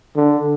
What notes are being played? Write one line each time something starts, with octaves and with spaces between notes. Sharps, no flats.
D3